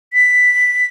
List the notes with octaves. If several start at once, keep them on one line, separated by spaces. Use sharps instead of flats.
B6